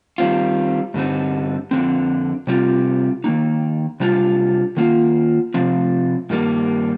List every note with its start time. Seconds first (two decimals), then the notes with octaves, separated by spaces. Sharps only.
0.18 D#3 G3 C4 F4
0.94 G2 D3 G3 C4 D#4
1.71 F2 D3 F3 C4
2.47 C3 G3 C4 F4
3.24 D#3 A#3 D#4
4.00 C3 G3 D4 F4
4.77 D#3 A#3 F4
5.54 C3 F3 C4
6.30 G2 D#3 G3 A#3